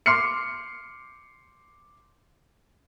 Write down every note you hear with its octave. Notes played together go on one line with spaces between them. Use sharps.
C6 D6 F6 C7 C#7